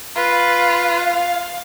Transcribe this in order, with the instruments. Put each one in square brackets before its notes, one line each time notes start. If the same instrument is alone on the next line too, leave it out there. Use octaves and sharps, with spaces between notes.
[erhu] F4 [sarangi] B4
[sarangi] F5